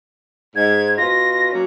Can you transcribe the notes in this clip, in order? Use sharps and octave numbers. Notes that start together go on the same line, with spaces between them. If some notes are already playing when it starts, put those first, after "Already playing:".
G#2 G#6
B2 F4 A#6
F#3 A#3 C#4